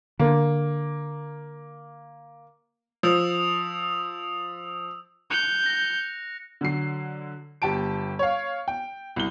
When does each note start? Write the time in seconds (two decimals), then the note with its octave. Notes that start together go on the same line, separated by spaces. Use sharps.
0.19 D3 A#3
3.03 F3 D#6 E6 F7
5.31 F#6 G6 C#7 F7
5.66 A#6
6.61 D3 F#3 C7
7.62 G1 G4 A5 D7
8.19 C#5 F5
8.68 G5
9.16 C2 G7